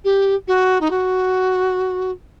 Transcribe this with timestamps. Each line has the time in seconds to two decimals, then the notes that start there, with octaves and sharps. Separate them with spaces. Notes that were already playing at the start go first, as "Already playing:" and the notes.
0.04 G4
0.47 F#4
0.81 D#4
0.90 F#4